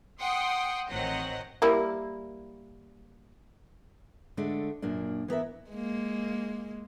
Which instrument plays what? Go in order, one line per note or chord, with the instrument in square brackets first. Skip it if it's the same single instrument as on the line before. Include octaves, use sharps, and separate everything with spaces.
[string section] F#5 G5 C6 D#6
A1 D#3 F#3 C4 D#5 F#5
[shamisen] G3 A#3 E4
[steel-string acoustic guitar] D3 G#3 A3 D4
F#2 A#2 A#3 D4
E3 B3 A#4 E5
[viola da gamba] G#3 A#3